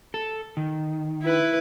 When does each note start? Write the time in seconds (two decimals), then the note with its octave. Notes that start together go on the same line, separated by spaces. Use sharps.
0.14 A4
0.57 D#3
1.23 E4 B4